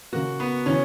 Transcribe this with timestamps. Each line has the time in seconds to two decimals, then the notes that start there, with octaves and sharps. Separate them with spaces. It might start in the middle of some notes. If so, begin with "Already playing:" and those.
0.12 C#3 F#3 A#3 F#4
0.40 B3
0.66 C#3 E3 C#4